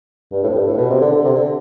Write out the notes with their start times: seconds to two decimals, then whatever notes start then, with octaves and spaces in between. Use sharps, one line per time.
0.31 G2
0.43 A2
0.49 F2
0.55 G2
0.67 A2
0.77 B2
0.90 C3
1.01 D3
1.12 D3
1.25 C3
1.35 D3